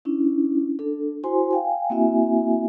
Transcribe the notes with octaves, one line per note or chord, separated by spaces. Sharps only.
C#4 D4 E4
D4 A4
E4 F#4 C5 G#5 C6
F5 G5 G#5
A#3 C4 E4 F#4 E5 G#5